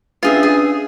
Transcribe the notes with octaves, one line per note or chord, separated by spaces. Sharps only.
C#4 D4 F4 G#4 B4 E5
G#4